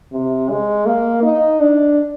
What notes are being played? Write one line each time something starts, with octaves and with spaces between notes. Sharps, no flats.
C3
G#3
A#3
D#4
D4